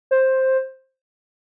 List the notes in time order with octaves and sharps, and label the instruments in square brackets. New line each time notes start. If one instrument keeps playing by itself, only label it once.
[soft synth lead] C5